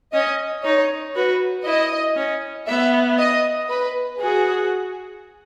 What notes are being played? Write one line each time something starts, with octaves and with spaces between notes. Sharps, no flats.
C#4 D#5
D#4 C#5
F#4 B4
E4 D#5
C#4
B3 E5
D#5
B4
F#4 G#4